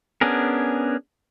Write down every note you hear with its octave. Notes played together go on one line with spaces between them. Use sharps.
B3 C#4 D4 G#4 A#4